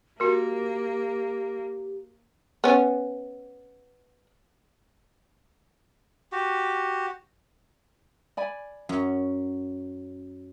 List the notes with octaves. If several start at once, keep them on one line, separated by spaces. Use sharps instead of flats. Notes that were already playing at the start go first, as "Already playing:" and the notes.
A#3 F#4 G4 A#4
B3 C#4
F#4 G4
D5 G#5 B5
F#2 C#4